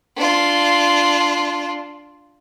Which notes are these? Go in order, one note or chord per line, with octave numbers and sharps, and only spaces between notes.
D4 F4